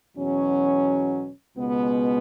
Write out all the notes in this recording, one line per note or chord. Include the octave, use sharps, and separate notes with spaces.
E2 B2 F#3 C#4
C#2 B2 G#3 B3